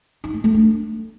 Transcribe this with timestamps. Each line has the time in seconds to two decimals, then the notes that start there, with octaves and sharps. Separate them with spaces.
0.24 D#4
0.34 A3
0.44 A3
0.54 D4